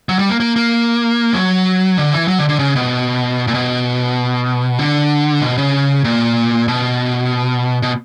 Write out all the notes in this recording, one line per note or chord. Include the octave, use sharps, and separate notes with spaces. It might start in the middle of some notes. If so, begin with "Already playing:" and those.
F#3
G3
A#3
A#3
A#3
F#3
D3
E3
F#3
D3
D3
C#3
B2
A#2
B2
D3
B2
C#3
A#2
B2
B2